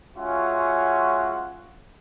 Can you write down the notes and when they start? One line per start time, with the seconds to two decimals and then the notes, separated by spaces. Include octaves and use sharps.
0.16 G#3 C#4 F4 F#4 E5 F#5